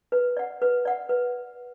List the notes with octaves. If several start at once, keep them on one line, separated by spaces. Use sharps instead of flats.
B4
D5 F#5
B4
D5 F#5
B4